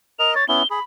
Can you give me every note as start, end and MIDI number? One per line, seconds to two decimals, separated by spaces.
0.19 0.34 70
0.19 0.34 75
0.19 0.34 101
0.35 0.44 73
0.35 0.48 93
0.49 0.63 59
0.49 0.63 61
0.49 0.63 64
0.49 0.67 103
0.70 0.79 68
0.70 0.83 83